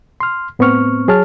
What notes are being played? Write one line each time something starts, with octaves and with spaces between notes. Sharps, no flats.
C6 F6
A2 B3 C4 C#6 F6
F#3 G#4 C#5 A5 F6